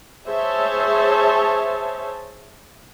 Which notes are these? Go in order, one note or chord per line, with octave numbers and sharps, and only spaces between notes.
G#4 C5 C#5 E5 A5